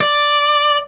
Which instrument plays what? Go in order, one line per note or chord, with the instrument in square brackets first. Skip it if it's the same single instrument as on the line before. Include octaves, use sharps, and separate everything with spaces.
[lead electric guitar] D5